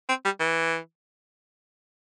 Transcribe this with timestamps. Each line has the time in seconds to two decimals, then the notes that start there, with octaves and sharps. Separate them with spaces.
0.09 C4
0.25 G3
0.40 E3